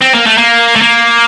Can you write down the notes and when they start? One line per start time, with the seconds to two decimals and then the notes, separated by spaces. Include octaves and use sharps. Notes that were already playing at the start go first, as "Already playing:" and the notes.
0.02 C4
0.15 A#3
0.27 A3
0.38 A#3
0.76 A3
0.82 A#3